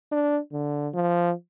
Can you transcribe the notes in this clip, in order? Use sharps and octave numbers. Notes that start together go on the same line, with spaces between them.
D4
D3
F3